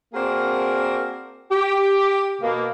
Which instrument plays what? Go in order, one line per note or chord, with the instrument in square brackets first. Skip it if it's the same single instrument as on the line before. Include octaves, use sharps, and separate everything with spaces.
[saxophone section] A#3 C4 D4 F#4 G#4 A#4
G4
B2 A#3